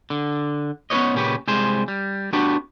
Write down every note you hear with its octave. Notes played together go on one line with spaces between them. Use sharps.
D3
B3 C#4 D#4 B4 C#5 D#5
A#2 C#3 C#4 G4 B4
C2 G3 G#3 G#4 C5
G3
B3 D4 F#4 G4